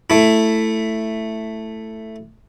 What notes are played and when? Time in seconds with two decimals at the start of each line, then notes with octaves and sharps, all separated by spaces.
0.10 A3 E4